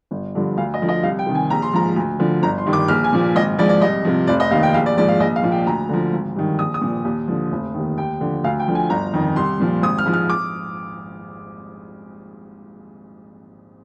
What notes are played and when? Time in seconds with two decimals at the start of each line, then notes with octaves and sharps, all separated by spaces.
0.11 G1
0.35 G2 D3 F3
0.57 D2 F5
0.74 D#5
0.81 D3 F3
0.89 D#5
1.03 C2 F5
1.19 G5
1.27 C3 D#3
1.35 G#5
1.50 A#1 A#5
1.62 C6
1.73 G#2 F3 A#5
1.96 D2
2.19 D3 F3
2.42 G1 A#5
2.58 C6
2.66 G2 D#3
2.73 D6
2.88 A#1 F6
3.04 G#5
3.13 A#2 F3
3.35 G#1 D#5
3.58 G#2 F3 D5
3.69 D5
3.82 C2 D#5
4.05 C3 F3
4.27 F1 D5
4.40 D#5
4.51 D#2 D#3 F5
4.63 G5
4.74 A#1 F5
4.86 D5
4.97 G#2 F3 D5
5.08 F5
5.20 A#1 D#5
5.36 F5
5.43 A#2 F3
5.52 G5
5.67 D2 A#5
5.89 D3 F3
6.13 G#1
6.36 G2 D#3
6.58 A#1 D#6
6.74 D#6
6.81 A#2 F3
7.05 D#2
7.28 D3 F3
7.52 F1
7.74 D#2 D#3
7.98 D#2 G5
8.21 D3 F3
8.44 D2 F5
8.60 G5
8.68 D3 F3
8.75 G#5
8.90 G1 A#5
9.13 F2 D#3
9.36 C2 C6
9.60 A#2 F3
9.82 G#1 D#6
9.98 F6
10.06 G#2 F3
10.14 F6
10.30 D6